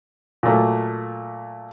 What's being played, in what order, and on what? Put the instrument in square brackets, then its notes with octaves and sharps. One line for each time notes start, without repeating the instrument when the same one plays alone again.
[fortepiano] A#2 F#3 A3 A#3